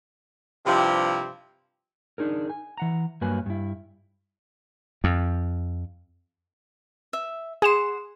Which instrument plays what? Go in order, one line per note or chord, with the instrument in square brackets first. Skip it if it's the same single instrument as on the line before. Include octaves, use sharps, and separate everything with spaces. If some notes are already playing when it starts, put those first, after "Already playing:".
[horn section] G2 C3 F3 C4 E4 G4
[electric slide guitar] D4 D#4 G#4 A#4
G#5
E3 F#5 A#5
G2 F#3 A#3 B4 G#5
G2 E4
[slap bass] F2
[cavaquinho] E5
[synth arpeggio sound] G#4 E7 [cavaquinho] F#5 C6